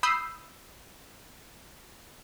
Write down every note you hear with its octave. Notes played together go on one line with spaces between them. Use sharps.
B5 D#6 E6 G6 C7